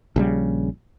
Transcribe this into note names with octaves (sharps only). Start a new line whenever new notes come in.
A#1 C#3 G3